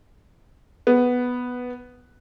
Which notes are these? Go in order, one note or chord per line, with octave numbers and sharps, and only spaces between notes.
B3